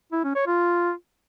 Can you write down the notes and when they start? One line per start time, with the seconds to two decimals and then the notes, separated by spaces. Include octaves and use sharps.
0.12 E4
0.24 C#4
0.36 C#5
0.47 F4